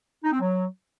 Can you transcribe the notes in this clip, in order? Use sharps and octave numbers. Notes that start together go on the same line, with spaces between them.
D#4
C4
F#3